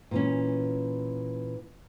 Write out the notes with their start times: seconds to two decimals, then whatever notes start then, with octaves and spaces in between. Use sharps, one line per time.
0.11 A#2 E3 C#4